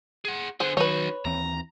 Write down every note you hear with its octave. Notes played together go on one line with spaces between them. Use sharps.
G#4 F#5
D3 B3 G#4 C5
D#3 F#3 D#4 F#4 B4 C#5
D#2 E3 C4 A#5